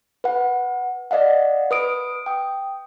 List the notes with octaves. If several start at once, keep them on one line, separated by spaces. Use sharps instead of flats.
B4 F#5
D5 D#5 F5 F#5
B4 D#6 D7
G5 D#6